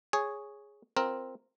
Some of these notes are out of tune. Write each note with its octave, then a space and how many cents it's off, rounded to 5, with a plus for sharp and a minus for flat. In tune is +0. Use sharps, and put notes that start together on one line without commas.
G#4 +0 C#5 +0
C4 +0 F4 +0 A#4 +0